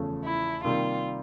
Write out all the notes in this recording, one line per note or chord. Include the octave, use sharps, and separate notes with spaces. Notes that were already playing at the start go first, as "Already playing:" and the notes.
Already playing: E2 C#3 F3 A3 C#4
E4
C3 D#3 G3 A#3 F4